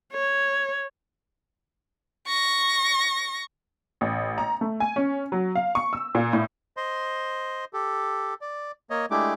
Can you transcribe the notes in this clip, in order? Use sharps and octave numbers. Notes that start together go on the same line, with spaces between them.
C#5
C#6 A#6
A1
A#5
A3
G#5
C#4
F#3
F5
C#6
E6
A#2
A2
C5 D#5 C6
G4 A4
D5
A#3 C#5 D#5
G#3 A3 D4 E4 G4 D6